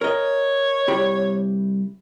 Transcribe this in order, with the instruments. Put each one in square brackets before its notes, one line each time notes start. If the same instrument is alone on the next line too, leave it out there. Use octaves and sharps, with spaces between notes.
[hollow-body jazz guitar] A#4 D#5 [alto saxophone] C#5
[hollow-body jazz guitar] C2 G4 B5